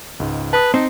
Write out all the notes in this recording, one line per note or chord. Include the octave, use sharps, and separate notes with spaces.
C#2 G#2
B4 A5 D#6
C4 D#4